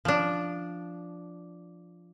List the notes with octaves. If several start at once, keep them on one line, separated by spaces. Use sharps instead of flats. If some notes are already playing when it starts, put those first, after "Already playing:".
F3 D4